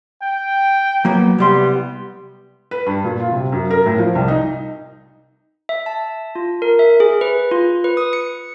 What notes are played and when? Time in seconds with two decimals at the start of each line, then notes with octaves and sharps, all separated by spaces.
0.22 G5
1.05 F#3 A#3 B3
1.38 C2 G3 B3 C6
2.71 B4
2.86 G2
3.04 A#2
3.20 F4
3.32 C3
3.52 F#2
3.71 A#4
3.86 A2
3.98 F3
4.15 C2
4.28 D#4
5.69 E5
5.86 A5
6.35 F4
6.62 A#4
6.79 E5
7.00 G#4
7.21 B4
7.51 F4
7.84 B4
7.97 D#6
8.13 C#7